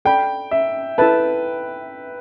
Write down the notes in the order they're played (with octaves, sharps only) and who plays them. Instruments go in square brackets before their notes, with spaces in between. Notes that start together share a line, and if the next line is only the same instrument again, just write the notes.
[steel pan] A4 D5 B5 [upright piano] G5
[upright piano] E5
[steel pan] E4 A4 E5 A5 [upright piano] B4